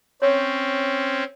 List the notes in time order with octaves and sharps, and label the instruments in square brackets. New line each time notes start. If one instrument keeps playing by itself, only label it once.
[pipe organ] C4 C#4 [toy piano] C#5